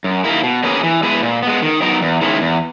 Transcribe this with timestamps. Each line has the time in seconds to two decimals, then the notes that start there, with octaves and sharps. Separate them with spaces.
0.04 F#2
0.24 D#3 A#3 E4
0.43 B2
0.64 A#3 C#4 G#4 B4
0.83 E3
1.03 G#3 B3 E4 B4
1.23 A#2
1.42 G#3 B3
1.62 D#3
1.82 F#3 B3 D#4 A#4
2.02 E2
2.21 D#3 G#3 C#4 E4
2.41 E2